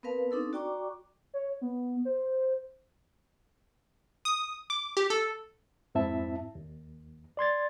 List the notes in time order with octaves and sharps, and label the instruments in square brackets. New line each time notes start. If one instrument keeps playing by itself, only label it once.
[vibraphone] B3 C4 A#4 B4 F5 A5
C4 D4 D#4 A4 E6
F#4 D5 G5 A#5 C#6 D6
[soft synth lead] C#5
B3
C5
[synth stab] D#6
D6
G4
A4
[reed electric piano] F2 G#2 C4 E4 E5 A5
D#2
D5 C6 G#6 A6